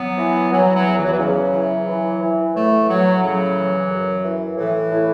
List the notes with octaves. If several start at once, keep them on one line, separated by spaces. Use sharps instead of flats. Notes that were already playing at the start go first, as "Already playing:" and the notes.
Already playing: F#3 B3
E3
E3 F#3
F#3
E2
E3
F#3
E3
C#3 F#3
E3
E3
E3
A2 E3 A3
A2 F#3
C#3 F#3
E3
F#2
E3
A2 E3
A2